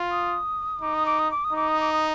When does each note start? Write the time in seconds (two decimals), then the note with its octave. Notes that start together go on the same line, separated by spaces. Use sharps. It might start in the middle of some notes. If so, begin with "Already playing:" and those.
Already playing: F4
0.11 D#6
0.82 D#4 D6
0.94 D#6
1.06 D6
1.19 D#6
1.31 D6
1.44 D#6
1.53 D#4 D6
1.68 D#6
1.81 D6
1.93 D#6